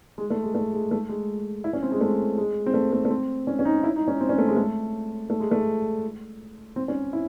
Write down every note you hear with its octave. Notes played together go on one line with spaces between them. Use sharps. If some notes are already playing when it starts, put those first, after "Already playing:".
G#3
A3
G#3
A3
G#3
A3
G#3
E4
C#4
C4
G#3
A3
G#3
C4
A3
A3
A3
C4
C#4
C#4
D#4
E4
D#4
C#4
C4
C#4
A3
G#3
A3
A3
G#3
A3
C4
C#4
E4